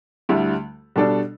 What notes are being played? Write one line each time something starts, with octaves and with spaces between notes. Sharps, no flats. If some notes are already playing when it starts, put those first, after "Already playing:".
D2 D3 G3 E4
B2 G3 D4 A4 D5